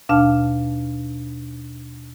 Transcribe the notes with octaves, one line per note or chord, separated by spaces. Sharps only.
D#2 B2 D4 F5 A5 F6